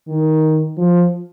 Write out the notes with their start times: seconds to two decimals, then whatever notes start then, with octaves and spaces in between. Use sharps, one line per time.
0.08 D#3
0.78 F3